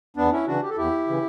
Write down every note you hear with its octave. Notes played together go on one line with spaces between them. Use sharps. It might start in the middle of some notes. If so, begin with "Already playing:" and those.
E2 B3 D4
C#4 E4
C#3 E3 D4 F#4
G4
A4
E2 E4 G4
C#3 E3